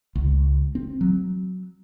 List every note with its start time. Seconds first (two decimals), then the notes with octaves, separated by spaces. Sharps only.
0.15 C#2
0.75 C4
1.01 F#3